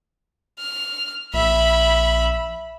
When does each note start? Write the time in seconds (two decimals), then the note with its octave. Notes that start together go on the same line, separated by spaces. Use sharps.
0.60 F6
1.34 A#1 E5 B5